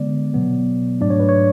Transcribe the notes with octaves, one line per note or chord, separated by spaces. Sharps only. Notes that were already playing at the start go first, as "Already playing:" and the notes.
Already playing: D3 G#3 B3 D5
B2 F#3 B3
G#2 F#3 A3 D4 D5
C#5
B4
C#5